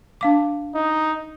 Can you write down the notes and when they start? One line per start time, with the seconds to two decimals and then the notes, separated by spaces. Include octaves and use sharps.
0.21 D4 F5 D6
0.75 D#4